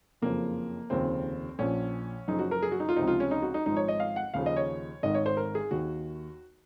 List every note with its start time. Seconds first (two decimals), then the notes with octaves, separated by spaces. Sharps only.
0.22 F#1 F2 C#3 F3 A#3
0.90 F1 D#2 C#3 F3 C4
1.59 A#1 A#2 F3 C#4
2.28 F#1 F#2 F3 D#4
2.39 F#4
2.51 A#4
2.63 G#4
2.71 F#4
2.80 D#4
2.89 F4
2.96 C#2 C3 F3 D#4
3.07 F4
3.20 C#4
3.31 D#4
3.42 F#4
3.54 D#4
3.66 G#1 G#2 F3 D#4
3.76 C#5
3.88 D#5
4.00 F5
4.16 F#5
4.34 D#2 C#3 F3 F5
4.46 D#5
4.56 C#5
5.03 G#1 G#2 D#3 D#5
5.15 C#5
5.26 C5
5.37 A#4
5.55 G#4
5.71 D#2 D#3 F#4